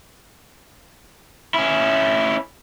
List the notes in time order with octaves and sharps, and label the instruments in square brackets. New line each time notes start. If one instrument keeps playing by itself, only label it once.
[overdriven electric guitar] C#4 E4